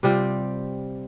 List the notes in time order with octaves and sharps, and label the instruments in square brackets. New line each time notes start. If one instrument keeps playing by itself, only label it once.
[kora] C3 G3 C4 F4